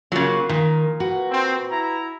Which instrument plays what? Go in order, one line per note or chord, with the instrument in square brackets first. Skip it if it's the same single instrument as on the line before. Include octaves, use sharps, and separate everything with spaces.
[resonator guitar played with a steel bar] C#3 F#3 [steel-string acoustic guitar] A#3 C#4 F4
[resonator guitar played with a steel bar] A#2 [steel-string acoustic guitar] D#3
[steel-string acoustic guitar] F#4 B4
[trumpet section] C4
E4 A#5